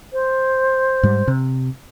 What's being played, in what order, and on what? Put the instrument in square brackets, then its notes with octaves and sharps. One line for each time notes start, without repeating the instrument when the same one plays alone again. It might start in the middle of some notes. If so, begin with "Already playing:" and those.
[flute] C5
[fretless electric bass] G#2 G3
C3